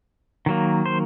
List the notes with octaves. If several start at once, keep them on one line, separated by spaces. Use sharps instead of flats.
D#3 F#3 A#3
C5